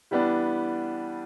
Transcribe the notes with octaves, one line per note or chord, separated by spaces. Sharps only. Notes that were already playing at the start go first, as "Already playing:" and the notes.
E3 G3 B3 D4